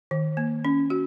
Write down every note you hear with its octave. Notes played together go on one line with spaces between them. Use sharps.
D#3
A#3
C#4
F#4